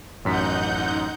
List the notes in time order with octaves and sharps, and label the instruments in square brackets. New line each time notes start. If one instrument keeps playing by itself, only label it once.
[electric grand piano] A1 F#2 B6 [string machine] D#4 F#5 G6